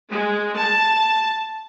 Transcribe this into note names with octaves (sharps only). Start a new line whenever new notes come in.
G#3
A5